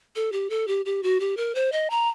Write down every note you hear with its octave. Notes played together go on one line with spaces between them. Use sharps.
A4
G4
A4
G4
G4
F#4
G4
A#4
C5
D#5
A#5